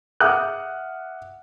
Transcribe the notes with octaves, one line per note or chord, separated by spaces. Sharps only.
E5 F#5 D6 D#6 F6 F#6